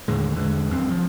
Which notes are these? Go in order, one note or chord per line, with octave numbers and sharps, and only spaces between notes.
D#2 A2 D3 G#3
E2 D3 G#3
F1 F#2 C4
F3